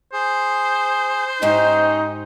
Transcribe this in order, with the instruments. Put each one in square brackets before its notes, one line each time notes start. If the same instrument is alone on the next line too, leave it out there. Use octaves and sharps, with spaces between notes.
[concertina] G#4 [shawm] C5
[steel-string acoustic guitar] G#2 G4 D#5 [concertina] C#4 [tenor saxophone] D#4